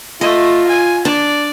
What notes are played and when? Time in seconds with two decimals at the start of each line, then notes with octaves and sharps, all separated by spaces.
0.21 A3 F4 D#5
0.68 G#5
1.05 D4 D5